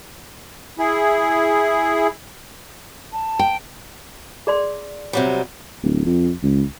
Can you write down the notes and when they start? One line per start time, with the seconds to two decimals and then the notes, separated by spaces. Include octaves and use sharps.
0.79 E4 G#4
3.12 A5
3.39 G5
4.47 G#4 D5 C6
5.13 C3 F#3 G3
5.83 D1
6.06 F2
6.43 C#2